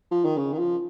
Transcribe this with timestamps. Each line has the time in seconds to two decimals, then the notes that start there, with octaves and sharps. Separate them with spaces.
0.11 F3
0.25 D#3
0.37 C#3
0.53 D#3
0.58 F3